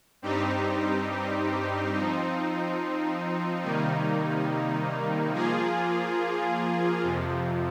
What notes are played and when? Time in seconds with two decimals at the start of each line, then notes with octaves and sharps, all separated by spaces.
0.22 G2 G3 C4 D#4 G4
1.93 F3 C4 D#4
3.62 C3 D#3 G3 A#3 D#4
5.33 F3 A#3 F4 G#4
7.03 F2 C3 F3